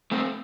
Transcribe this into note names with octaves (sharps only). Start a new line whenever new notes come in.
A3 C4